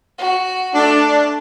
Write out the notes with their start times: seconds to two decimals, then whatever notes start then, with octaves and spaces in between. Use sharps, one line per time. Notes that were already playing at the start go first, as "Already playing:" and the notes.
0.18 F#4
0.75 A3 D4